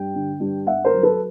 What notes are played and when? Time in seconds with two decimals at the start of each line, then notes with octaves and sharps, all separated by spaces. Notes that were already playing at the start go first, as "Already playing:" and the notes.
Already playing: G2 G5
0.15 D3
0.40 G2
0.67 G2 E5 F#5
0.85 A#4 C5
0.93 F#3
1.03 A4 B4